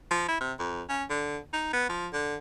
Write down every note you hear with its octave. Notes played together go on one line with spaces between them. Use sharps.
F3
E4
C3
F2
C#4
D3
D#4
B3
F3
D3